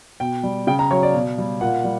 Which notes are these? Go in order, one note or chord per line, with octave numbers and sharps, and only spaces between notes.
B2 G5
G3
C#3 G5
A#5
F#3 C#5
D5
B2
G3
A#2 F#5
G3